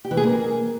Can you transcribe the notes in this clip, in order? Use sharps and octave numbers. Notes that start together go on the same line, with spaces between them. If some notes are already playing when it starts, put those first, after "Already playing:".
G4
E3
G#4
A#3